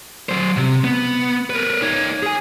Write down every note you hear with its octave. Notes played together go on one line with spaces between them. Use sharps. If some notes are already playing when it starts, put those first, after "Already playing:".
F#3 C5
C3
B3
A#4 B4
D#4 C#5
G#4 G#5